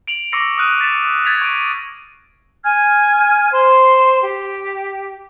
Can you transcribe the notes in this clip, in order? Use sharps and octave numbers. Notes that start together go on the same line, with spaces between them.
D7 F7 F#7
C#6 D6 E6 A#6 C7 C#7
D#6 F6 F#6 D#7
A6 B6 C#7 E7
G#6 A6 B6 F7
C#6 G6 D7 D#7
G#5 F6 G#6
C5 C6
G4